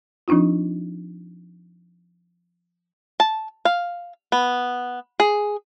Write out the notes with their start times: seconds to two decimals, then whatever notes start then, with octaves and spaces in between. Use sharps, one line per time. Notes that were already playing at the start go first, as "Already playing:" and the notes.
0.28 F3 C4 D4 D#4 F4
3.20 A5
3.65 F5
4.32 B3
5.20 G#4